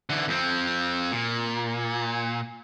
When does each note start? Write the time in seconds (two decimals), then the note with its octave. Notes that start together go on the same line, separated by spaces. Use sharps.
0.10 D3 E3
0.28 F2 C4
1.12 A#2